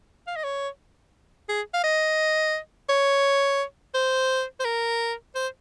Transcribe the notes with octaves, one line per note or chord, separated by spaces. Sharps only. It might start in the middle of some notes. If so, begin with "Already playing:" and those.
F5
D#5
C#5
G#4
F5
D#5
C#5
C5
C5
A#4
C5